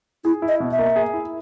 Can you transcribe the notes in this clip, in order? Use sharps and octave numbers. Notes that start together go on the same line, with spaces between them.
E4 G#4
E4
D#5
B2
E5
A#3
G#4
E4